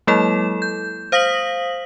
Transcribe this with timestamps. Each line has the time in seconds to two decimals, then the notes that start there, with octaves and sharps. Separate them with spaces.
0.07 F#3 G#3 A#3 E4 A4 E7
0.62 G6
1.12 C5 F5 D#6 A#6 B6 F#7